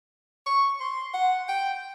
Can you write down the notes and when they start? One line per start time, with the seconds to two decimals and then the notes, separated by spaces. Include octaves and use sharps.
0.46 C#6
0.80 C6
1.14 F#5
1.48 G5